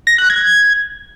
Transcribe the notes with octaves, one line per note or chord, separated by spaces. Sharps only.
A#6
F#6
G#6